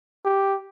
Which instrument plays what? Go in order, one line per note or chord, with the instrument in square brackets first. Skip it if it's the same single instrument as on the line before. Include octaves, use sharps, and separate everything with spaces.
[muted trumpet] G4